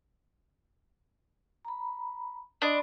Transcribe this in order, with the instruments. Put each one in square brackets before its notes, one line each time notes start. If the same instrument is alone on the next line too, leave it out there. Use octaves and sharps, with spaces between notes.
[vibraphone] A#5 B5
[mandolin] D4 D#5 [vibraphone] D5 B5 C6